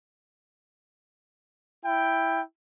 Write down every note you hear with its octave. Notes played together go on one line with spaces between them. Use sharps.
E4 G5